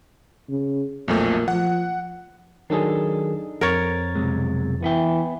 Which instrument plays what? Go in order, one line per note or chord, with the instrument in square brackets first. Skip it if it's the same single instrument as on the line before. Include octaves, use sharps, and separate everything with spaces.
[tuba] C#3
[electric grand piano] B1 F2 A3 [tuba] A#2
[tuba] F3 [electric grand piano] F#5
[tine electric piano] D#3 F#3 G#4 [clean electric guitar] D4 D#4 A4
[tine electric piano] F2 A6 [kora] A#4 C#5
[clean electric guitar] B1 C3 G#3
[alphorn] E3 [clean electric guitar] B3 B4 G5